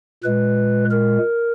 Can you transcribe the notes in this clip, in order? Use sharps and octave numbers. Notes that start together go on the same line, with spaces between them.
A#2 G#3 B4
A#4